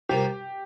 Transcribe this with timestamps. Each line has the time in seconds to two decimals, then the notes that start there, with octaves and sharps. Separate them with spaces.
0.09 C2 C3 A#3 F4 G4